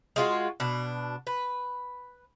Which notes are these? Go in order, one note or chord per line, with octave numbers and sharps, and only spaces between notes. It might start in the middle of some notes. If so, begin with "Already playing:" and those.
G#3 F4 F#4
B2 D4
B4